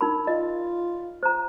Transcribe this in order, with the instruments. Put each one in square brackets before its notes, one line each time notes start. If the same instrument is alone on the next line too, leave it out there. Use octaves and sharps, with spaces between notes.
[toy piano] D#4 A#4 B5
[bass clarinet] F4 [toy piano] D#5
[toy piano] C5 A#5